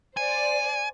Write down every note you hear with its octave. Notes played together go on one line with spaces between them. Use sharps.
C5 D5 G#5